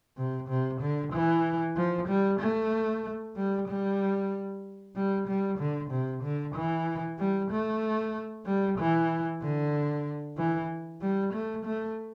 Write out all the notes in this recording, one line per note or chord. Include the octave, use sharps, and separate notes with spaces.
C3
C3
D3
E3
F3
G3
A3
G3
G3
G3
G3
D3
C3
D3
E3
G3
A3
G3
E3
D3
E3
G3
A3
A3